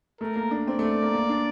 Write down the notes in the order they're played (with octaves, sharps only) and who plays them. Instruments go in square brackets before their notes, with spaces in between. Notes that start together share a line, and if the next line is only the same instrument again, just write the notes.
[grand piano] A3 [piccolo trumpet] A#4
[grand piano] A#3
D4
[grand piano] C4 [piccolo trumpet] D5
[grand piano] A3
A#3
A#3
D4